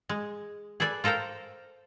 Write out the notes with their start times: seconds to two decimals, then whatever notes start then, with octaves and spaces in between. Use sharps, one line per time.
0.09 G#3
0.80 G#4 A4 B4 D5 G#5
1.04 F4 A4 A#4 C5 G5